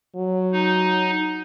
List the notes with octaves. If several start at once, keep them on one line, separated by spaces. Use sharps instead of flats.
F#3
D#4